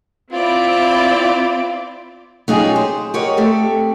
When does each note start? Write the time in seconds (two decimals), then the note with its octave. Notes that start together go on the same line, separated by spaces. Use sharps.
0.32 C4 E4 F4 D5
2.48 F#3 C#4 D#4 F4 G4 G#4
2.76 C5
3.14 G4 A#4 C#5 D#5 F#5 G5
3.37 A3 C4 G4 A4 D5